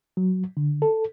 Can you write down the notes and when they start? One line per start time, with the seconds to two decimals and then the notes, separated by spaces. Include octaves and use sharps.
0.17 F#3
0.57 D3
0.82 A4